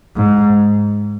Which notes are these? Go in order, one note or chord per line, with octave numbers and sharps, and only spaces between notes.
G#2